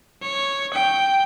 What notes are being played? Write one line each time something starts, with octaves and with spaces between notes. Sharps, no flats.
C#5
G5